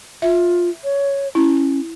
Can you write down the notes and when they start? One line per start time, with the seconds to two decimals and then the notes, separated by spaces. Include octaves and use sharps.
0.22 F4 E5
0.84 C#5
1.35 C#4 E4